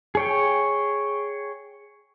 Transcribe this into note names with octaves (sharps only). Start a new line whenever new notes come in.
G#4 C#5 G5